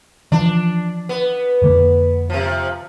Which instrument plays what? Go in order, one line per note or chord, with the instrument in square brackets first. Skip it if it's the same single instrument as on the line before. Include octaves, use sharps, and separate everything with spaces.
[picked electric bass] E3 F3 [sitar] D4
[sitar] B3
[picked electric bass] F2 D3 A#3
[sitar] C3 F3